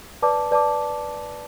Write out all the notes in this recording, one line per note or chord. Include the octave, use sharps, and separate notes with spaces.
B4 D5 A5 D6
B4 D5 A5 D6